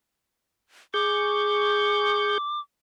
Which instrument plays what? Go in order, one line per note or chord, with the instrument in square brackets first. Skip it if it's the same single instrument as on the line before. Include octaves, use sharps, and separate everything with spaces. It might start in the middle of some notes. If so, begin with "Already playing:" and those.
[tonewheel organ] G#4 C#6 G6 [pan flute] D6